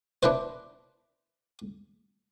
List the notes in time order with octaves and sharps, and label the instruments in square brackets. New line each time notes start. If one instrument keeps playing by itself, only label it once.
[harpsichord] D4 E4 B4 C5